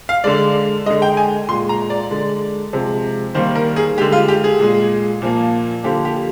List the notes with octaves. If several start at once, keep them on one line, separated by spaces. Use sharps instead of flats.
F5
D3 G#3 D5
D3 G#3 D#5
G5
G#5
A#2 G#3 C6
A#5
D5
D3 G#3
C3 F3 G#3
D#3 G3 A#3 C5
A#4
G#4
D3 G#3 G4
F4
G4
G#4
A#2 G#3
A#2 F3 A#3
D3 F3 A#3 G4
G4